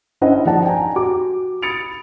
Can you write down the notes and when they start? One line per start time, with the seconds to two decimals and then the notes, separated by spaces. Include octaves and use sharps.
0.21 C#4 D4 E4 C5 D#5 F#5
0.45 F3 D#4 D5 F#5 A5
0.65 G5 G#5 A#5
0.96 F#4 D6
1.62 B5 D#6 A6 C#7 D7 F7